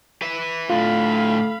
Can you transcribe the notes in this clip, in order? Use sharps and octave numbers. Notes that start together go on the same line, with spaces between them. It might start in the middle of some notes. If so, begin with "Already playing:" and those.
B4 E5
A2 D3 A3 F4 F5 B5